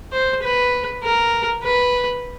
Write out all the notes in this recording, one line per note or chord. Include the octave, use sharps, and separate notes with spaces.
C5
B4
A#4
B4